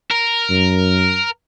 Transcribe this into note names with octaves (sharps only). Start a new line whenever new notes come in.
A#4
F#2